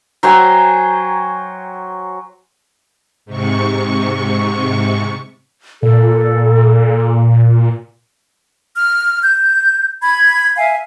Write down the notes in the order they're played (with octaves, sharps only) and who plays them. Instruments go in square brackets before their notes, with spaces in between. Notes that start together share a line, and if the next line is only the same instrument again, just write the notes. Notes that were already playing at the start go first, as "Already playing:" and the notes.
[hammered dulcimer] F#3 C5 G5 G#5
[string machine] G#2 C3 C#6
[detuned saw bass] A#2 [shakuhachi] A4
[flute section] F6
G6
B5 G#6
E5 F5 G#5